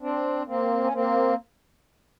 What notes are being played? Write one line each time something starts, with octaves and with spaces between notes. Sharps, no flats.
C4 D4
A#3 C4
C#4
A#3 C4